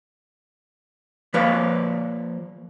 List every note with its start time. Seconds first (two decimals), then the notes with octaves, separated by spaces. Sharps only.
1.34 F3 A#3 B4 C#5 F5